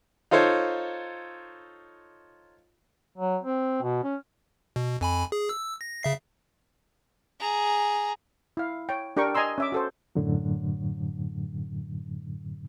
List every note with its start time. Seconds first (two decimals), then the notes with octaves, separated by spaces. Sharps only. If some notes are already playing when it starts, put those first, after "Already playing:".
0.31 D#4 F4 A4 C5 C#5
3.18 F#3
3.43 C4
3.83 B2
4.04 C#4
4.76 B2
5.01 F2 G#5 B5
5.32 G#4
5.49 E6
5.81 A#6
6.03 C#3 E5 C7
7.40 G#4 A#5
8.57 E4 F5
8.89 C#5 G5
9.17 D4 G4 A#4 G5 C#6
9.35 D#5 G#5 A#5 C6 E6
9.58 C#4 E5 D6
9.72 F#4 A4 C5
10.15 F#2 A2 D3 F#3